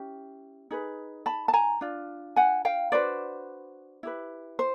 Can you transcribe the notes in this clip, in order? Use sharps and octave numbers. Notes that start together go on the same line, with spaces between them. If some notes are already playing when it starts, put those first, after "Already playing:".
Already playing: C#4 E4 G4
D#4 G#4 B4
A5 B5
A5
G#5 A#5
D4 F4
F#5 G#5
F5 G5
D4 F#4 B4 C5 D5
E4 G4 B4
C5